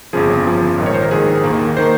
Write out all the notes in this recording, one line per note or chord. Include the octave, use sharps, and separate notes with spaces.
G1 F2 C#3 F3 G#4
G1 F2 C#3 F3
A#1 G#2 D#3
C#5
C5
A#4
A#1 G#2 D#3 G#4
D#2 D#3 A#3
D#3 A#3 C5